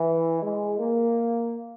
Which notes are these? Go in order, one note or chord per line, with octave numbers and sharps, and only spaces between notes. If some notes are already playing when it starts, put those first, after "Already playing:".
Already playing: E3
G#3
A#3